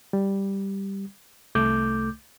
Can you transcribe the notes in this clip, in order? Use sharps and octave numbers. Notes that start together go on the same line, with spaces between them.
G3
C2 A3 D6 G6